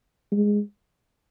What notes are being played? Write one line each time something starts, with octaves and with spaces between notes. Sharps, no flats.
G#3